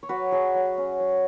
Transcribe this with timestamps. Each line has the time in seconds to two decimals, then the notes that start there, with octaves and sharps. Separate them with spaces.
0.03 C#5
0.09 F#3 F#4 B4
0.32 F#3 G#4
0.55 F#3
0.78 C#4
1.00 F#3